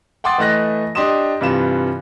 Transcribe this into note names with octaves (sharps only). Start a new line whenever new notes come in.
F#5 G5 C6 D6 D#6 A6
E3 A3 D#5 F#6 A#6
D4 G4 D#5 C6 D#6 E7
G2 C3 E3 F4 E7